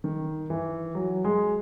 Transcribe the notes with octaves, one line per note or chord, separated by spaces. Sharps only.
D#3
E3
F#3
G#3